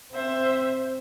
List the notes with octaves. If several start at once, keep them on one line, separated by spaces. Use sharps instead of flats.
C4 C5 E5